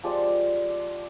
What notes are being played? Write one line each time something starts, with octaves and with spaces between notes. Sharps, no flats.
F3 G#3 G4 D5